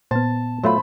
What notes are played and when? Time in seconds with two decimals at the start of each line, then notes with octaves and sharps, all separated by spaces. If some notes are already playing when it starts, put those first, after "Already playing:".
0.11 A#2 B3 C5 A5
0.63 F#3 A3 F4 C5 B5